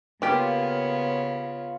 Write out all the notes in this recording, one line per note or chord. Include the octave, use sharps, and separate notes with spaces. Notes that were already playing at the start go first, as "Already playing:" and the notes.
C#3 A#3 B3 F4 G4 C#5